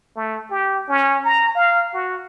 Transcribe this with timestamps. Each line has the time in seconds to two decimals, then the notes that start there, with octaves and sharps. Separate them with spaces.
0.16 A3
0.51 G4
0.89 C#4
1.25 A#5
1.55 F5
1.94 F#4